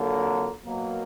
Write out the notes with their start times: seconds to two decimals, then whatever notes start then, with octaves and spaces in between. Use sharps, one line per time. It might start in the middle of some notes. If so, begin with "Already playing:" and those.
Already playing: F2 D3 F#3 A#3
0.63 B2 F#3 A#3